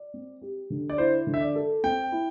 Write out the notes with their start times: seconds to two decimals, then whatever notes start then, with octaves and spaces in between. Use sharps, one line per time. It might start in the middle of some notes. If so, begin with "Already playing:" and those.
Already playing: D5
0.14 C4
0.42 G4
0.70 D3
0.90 D5
0.98 E4 C5
1.27 D3
1.34 E5
1.41 D5
1.55 A4
1.84 C4 G5
2.12 E4